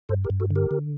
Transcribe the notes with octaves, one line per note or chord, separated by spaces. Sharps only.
G2 A4 C5
G4 A#4
G2
F#4 A4
D3
G4 A#4
D3